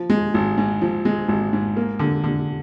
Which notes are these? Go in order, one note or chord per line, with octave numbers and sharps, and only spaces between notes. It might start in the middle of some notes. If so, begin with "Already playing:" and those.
Already playing: F3
G#3
G#1
G#2
F3
G#3
G#1
G#2
A#3
D3
D3